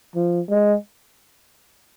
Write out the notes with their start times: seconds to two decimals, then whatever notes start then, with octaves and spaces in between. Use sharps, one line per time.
0.16 F3
0.50 G#3